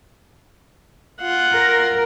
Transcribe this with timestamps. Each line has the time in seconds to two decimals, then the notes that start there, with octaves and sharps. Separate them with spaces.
1.21 F4 F#5
1.53 A#4